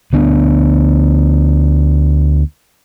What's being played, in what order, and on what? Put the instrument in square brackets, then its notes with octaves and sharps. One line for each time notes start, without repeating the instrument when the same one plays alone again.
[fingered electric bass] D2 B3 D4